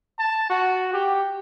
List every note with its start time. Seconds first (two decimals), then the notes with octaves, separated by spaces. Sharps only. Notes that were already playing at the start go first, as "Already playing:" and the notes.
0.19 A5
0.50 F#4
0.93 G4